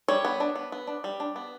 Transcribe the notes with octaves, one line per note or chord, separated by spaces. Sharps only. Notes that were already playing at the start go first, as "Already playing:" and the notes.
G3 C#5
B3
D4
B3
B3
D4
G3
D4
B3